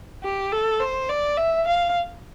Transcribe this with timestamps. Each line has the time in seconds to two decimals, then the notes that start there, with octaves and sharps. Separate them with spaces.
0.24 G4
0.52 A4
0.80 C5
1.09 D5
1.37 E5
1.67 F5